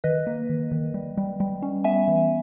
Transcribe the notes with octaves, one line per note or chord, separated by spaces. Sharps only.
D#3 B4 D#5
A#3
D#3
D#3
G3
G3
G3
C#4
B3 E5 G#5
E3